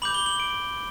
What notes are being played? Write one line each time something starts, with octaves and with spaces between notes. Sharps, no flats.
B5 D6 G6 F#7
G7
F#7
D7